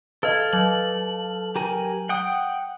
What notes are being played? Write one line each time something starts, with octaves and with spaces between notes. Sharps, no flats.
A4 B4 D#5 F5
F#3 F#7
G4 A#4 G#5
F#5 G5 D#6